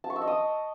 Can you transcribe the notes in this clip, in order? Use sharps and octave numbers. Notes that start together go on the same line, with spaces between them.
A5
C#6
E6
D#5
D#6